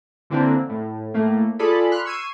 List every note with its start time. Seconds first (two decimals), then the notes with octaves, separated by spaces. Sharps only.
0.30 D3 E3 A#3 C4 D4 B4
0.69 A2
1.14 A2 A3 A#3
1.59 F4 G#4 A4 D5 A5 B5
1.91 B5 C6 F6 F#6
2.05 C#6 E6 G#6 C7 D#7